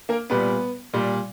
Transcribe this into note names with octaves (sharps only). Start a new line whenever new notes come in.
A#3 A#4
A#2 G3 B3 B4
A#2 G3